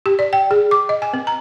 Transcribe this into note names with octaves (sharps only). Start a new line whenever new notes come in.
G4
D5
G5
G#4
D6
D#5
G#5
C4
A#5